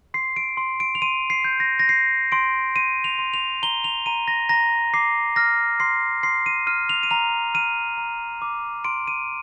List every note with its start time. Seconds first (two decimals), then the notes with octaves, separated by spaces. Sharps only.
0.14 C6 C7
0.36 D7
0.57 C6
0.80 D7
0.95 F7
1.02 C6 D#7
1.30 C7
1.45 G6
1.60 A#6
1.79 A#6
1.88 G6 C7
2.32 C6 D7
2.75 C6 D#7
3.04 F7
3.19 C6
3.34 F7
3.63 A#5 G7
3.84 F7
4.06 A#5 D#7
4.28 A#6
4.49 A#5 A#6
4.94 D6 C7
5.36 F6 A#6
5.80 C6 C7
6.23 C6 C7
6.46 D#7
6.67 F6 D#7
6.89 F7
7.03 D#7
7.11 A#5 F7
7.54 F6 D#7
7.98 A#5
8.42 D6
8.85 C6 D7
9.07 D#7